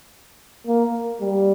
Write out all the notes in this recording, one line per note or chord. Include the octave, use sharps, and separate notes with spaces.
A#3
G3